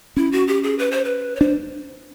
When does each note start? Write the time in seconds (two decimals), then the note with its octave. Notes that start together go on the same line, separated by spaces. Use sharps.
0.17 C#4 E4
0.32 F#4
0.48 G4
0.63 G#4
0.79 B4
0.91 C5
1.05 B4
1.36 C#5
1.41 D4 C5